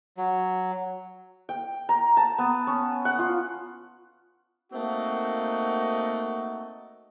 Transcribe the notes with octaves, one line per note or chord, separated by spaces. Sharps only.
F#3
G5
A#5
A5
B3
C#4
F#5
F4
A3 A#3 C4 D#4 F#4